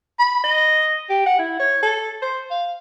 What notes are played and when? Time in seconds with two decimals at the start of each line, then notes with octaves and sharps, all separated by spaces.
0.19 B5
0.44 D#5
1.09 G4
1.26 F#5
1.39 E4
1.60 C#5
1.82 A4
2.22 C5
2.50 F5